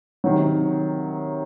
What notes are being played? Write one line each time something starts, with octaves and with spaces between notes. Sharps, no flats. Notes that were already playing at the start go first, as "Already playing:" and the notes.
C3 D#3 F#3